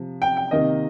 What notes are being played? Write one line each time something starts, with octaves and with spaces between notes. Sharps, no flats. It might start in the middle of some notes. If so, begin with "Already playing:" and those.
Already playing: C3 F3
G5
G5
C3 D#3 A#3 D#5